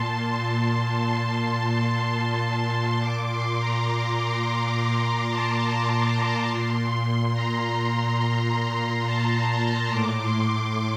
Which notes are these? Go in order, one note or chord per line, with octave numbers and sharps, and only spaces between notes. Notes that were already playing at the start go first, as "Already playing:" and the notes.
Already playing: A#2 A5 C6
C6
C6
C6
C6
A#2 D6
C6
A#5
C6
D6
C6
A5
C6
A#2
A#5
A5
A#5
C6
A2 D6
C6
C6